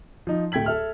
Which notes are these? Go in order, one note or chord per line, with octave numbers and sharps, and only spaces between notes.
F3 D#4
D1 A3 G5 G#6 B6 F#7
A4 E5 F6